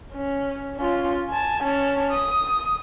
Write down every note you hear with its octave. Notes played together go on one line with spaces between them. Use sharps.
C#4
C#4 F4
G#5 A5
C#4 A5
D#6